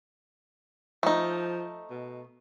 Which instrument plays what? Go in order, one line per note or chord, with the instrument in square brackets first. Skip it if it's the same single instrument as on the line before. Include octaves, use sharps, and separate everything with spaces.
[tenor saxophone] F3 [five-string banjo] A3 D#4
[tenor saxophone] B2